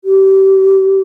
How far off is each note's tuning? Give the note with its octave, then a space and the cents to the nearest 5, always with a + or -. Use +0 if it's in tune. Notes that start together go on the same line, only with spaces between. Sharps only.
G4 -30